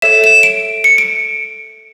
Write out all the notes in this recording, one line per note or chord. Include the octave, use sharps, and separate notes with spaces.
A4 C#5 E5 E7
E7
D7
C#7
D7